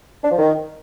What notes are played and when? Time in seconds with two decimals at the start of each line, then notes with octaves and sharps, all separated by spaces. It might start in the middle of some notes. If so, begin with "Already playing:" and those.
0.24 D4
0.31 F3
0.39 D#3